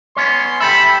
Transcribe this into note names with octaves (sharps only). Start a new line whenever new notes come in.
B3 C#4 C#5 C6
G4 A4 E5 B5